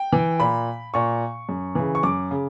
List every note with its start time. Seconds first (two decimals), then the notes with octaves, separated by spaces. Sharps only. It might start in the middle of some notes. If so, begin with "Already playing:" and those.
Already playing: G5
0.13 E3
0.40 A#2 B5
0.94 A#2 C#6
1.49 F#2
1.75 C#3 E3
1.95 C#6
2.03 F#2 D6
2.31 C#3